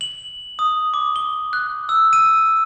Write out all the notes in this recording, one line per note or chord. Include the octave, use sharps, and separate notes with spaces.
F#7
D#6
D6
G7
F#6
E6
D#7